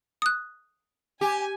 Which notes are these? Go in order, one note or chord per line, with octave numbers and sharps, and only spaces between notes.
D#6 F#6
G4 G#5